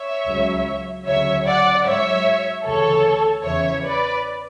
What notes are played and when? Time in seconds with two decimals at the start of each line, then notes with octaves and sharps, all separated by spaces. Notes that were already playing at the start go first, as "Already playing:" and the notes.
Already playing: C#5 E5
0.27 C#2 C#3 F#3
1.06 D2 C#3 F#3 C#5 E5
1.46 D5 F#5
1.85 G#2 F#3 C#5 E5
2.64 D2 C#3 E3 A4 C#5
3.43 E2 C#3 E3 C#5 E5
3.83 B4 D5